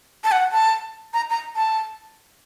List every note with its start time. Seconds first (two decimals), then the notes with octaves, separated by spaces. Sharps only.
0.24 A5
0.31 F#5
0.52 A5
1.13 A#5
1.30 A#5
1.56 A5